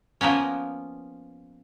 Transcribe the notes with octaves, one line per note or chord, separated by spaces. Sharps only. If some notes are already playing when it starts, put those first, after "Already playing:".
F3 A#3 B3 C#4